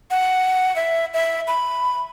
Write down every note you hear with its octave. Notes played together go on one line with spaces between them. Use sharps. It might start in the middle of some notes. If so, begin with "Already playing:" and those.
F#5
E5
E5
B5